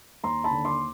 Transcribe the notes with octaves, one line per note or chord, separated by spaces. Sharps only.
D#2 A#5 C6
A5 B5
D3
C6 D6